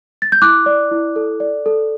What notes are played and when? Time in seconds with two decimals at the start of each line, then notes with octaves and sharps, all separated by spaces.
0.22 A6
0.32 G6
0.42 E4 D6 F#6
0.66 D5
0.91 E4
1.16 A4
1.40 D5
1.66 A4